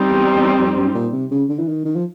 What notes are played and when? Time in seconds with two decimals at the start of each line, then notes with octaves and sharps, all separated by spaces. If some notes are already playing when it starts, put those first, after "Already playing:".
Already playing: G3 C4 D#4
0.09 E2
0.34 E2
0.58 F2
0.76 F#2
0.94 A#2
1.13 C3
1.31 C#3
1.49 D3
1.59 E3
1.68 D#3
1.85 D#3
1.96 F3